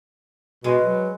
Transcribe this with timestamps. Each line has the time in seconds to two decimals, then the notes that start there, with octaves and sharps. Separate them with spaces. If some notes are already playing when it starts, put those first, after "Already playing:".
0.64 B2 G#3 B4
0.83 F#3